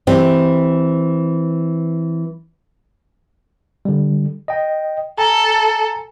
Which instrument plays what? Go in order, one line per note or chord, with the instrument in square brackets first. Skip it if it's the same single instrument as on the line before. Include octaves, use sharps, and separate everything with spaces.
[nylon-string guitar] E3 C4 G4
[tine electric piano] D3 G3
D#5 G5
[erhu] A4 [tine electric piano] G#5 A#5